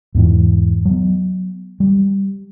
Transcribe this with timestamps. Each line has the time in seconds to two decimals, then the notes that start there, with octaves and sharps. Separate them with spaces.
0.15 E2 G#2 E3
0.85 F#3 B3
1.80 G3